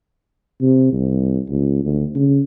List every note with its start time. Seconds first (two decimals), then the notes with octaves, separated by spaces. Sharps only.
0.61 C3
0.92 C2
1.49 C#2
1.83 D2
2.15 C#3